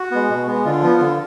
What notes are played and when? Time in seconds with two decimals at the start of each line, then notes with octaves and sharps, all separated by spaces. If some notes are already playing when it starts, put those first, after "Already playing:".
Already playing: F#4
0.11 G#3 B3
0.30 B2
0.47 G#3 B3
0.65 D3 F4
0.82 F3 B3
1.00 D3